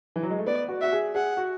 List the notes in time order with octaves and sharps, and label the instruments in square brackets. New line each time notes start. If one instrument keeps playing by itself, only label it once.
[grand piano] E3
F#3
G#3
A3
[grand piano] B3 [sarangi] D5
[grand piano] F#4
[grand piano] F#4 [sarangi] E5
[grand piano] G#4
[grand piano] G#4 [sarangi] F#5
[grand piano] F#4